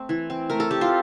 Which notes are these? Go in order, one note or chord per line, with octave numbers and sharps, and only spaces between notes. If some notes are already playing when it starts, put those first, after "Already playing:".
Already playing: A3 C4
E3
C4
A3 A#4
A4
C4 G4
F4